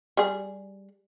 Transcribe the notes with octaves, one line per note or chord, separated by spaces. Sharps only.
G3 G#4